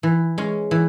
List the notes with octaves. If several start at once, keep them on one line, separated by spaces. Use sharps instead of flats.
E3
G#3 C#4
E3